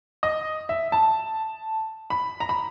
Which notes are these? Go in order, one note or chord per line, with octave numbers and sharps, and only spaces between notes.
D#5
E5
A5
B5
A#5
B5